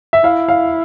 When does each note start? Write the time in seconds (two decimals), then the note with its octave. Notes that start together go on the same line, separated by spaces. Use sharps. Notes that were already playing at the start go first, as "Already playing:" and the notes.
0.13 E5
0.24 E4 F5
0.48 F5